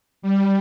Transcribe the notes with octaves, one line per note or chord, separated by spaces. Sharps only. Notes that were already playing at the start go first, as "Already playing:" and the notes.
G3